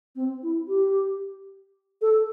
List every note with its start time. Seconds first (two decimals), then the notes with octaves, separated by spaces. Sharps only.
0.15 C4
0.42 E4
0.68 G4
2.01 A4